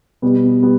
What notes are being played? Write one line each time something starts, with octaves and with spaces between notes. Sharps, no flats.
B2 G3 B3
G3 B3